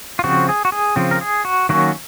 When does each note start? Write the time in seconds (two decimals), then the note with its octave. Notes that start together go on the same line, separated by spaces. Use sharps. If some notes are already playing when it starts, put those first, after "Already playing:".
0.19 F4
0.24 C#3 F3 C4 F#4
0.49 G#4
0.65 F#4
0.72 G#4
0.96 C#3 F3 C4
1.11 A#4
1.21 G#4
1.45 F#4
1.69 D#3 F#3 A#3 C#4 F#4